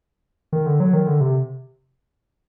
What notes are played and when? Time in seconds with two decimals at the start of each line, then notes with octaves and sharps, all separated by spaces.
0.53 D#3
0.66 D3
0.80 F#3
0.93 D#3
1.07 D3
1.21 C3